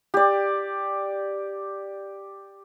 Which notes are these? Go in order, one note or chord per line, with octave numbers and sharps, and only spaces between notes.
G4 D5